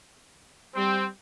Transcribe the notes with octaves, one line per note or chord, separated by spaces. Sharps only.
G3 C4